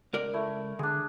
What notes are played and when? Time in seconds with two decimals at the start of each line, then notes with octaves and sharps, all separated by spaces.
0.13 C#2 A#4 D5
0.33 A3 E4
0.79 D3 D4 G#4